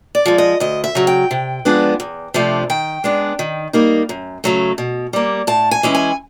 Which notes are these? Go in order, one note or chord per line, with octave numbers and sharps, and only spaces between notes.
D5
F3 G#3
D#5
D2 D#5
E5
C#3 F#3
G5
C3
F3 G#3 B3 D4
E2
C3 F3 A3 D4
D#3 G5
G#3 B3 D4
D#3
G3 A#3 D#4
F#2
C#3 F#3 A3
B2
G3 A#3
A2 A5
G#5
E3 G#3 C#4 E4
G#5